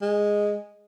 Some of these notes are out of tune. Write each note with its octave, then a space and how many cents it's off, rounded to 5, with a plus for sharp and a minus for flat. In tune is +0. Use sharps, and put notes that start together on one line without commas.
G#3 -5